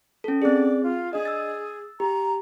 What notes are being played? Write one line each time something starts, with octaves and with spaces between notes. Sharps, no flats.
C#4 A4
C4 G#4 D5
F4
D4 G#4 D#5
E6 A6
G4 A#5